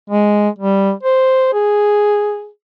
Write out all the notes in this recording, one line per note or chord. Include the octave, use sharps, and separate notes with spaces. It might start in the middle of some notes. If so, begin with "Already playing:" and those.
G#3
G3
C5
G#4